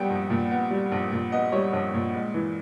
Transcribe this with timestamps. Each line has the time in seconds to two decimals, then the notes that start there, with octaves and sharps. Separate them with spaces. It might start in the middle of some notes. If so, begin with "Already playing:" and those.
Already playing: A#1 G3 B3 G5
0.10 A#1
0.30 A#2
0.51 B3
0.71 G3
0.92 A#1
1.12 A#2
1.32 B3 D#5
1.52 G3 C#5
1.73 A#1 C#5
1.94 A#2
2.15 G#3
2.34 E3